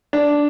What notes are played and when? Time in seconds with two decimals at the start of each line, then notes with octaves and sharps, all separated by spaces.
0.13 D4